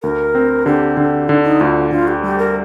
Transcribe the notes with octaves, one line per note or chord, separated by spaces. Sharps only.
D2 A#4
C4
D3 G4
D3
D3 D#4
D#4
D2 F4
D3 F4
G4
G3 G4
A#4